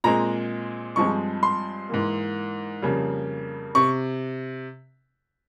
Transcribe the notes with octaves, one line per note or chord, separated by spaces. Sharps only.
A#2 G#3 C4 A#5
G2 F3 G#3 C4 C#6
C6
G#2 E3 A#3
F2 C#3 G3 A#3
C3 C#6